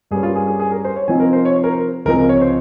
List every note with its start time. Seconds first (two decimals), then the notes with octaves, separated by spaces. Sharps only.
0.11 G2 G3 A#3 C#4 G#4
0.23 F4
0.35 G#4
0.47 G#4
0.60 G#4
0.72 A#4
0.85 C5
0.96 C#5
1.08 C3 F3 C4 D#4 G#5
1.20 A#4
1.33 C5
1.45 C#5
1.57 C5
1.64 A#4
1.72 C5
2.05 C#2 C3 F3 G#3 C4 A#4
2.29 C#5
2.41 C5